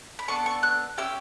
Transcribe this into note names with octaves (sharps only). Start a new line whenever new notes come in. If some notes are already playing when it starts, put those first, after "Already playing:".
B5
B3 D4 A4 C#6
C#6
F#6
C#4 E4 G4 E6